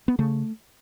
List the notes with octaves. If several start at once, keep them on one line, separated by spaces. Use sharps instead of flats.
B3
C#3 A3